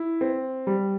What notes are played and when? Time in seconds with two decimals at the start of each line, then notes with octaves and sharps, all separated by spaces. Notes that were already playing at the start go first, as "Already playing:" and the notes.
Already playing: E4
0.21 C4
0.67 G3